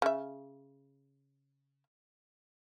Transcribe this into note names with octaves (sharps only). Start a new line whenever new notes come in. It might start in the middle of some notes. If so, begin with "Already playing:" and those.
C#3 E5